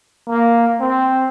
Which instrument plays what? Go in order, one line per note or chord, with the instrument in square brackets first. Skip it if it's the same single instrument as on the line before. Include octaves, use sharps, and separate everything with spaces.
[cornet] A#3
C4